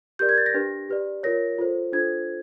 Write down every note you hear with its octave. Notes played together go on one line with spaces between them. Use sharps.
G4 A#4 D5 G6
G#6
A6
A#6
D4 G4 B4
G4 B4 D5
F4 A#4 C#5 A#6
F4 A4 C5
D4 F4 A4 C5 G#6